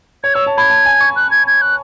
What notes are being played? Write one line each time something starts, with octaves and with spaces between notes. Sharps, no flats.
C#5 G#6
C#5 E6
A5
B5 G#6
A5
G#5
C#6
F#6
G#6
G#6
F#6